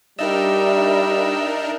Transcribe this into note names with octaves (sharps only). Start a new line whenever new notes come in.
G3 D4 D#4 A#4 D#5 E5 E6